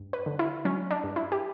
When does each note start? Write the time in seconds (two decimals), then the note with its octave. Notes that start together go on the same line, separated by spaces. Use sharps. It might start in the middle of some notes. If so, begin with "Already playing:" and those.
Already playing: G2
0.13 B4
0.26 D3
0.39 E4
0.65 F#3 C#4
0.91 D4
1.04 G2
1.16 E4
1.32 G4